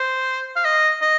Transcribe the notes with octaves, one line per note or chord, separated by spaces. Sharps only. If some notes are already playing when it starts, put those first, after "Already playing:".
Already playing: C5
F5
D#5
D#5